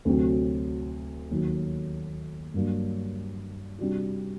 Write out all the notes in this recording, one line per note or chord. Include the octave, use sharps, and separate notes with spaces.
D2 C3 F#3 C4 F#4
D#2 D#3 F#3
G2 F#3 A#3 D4
C3 G3 D4 F#4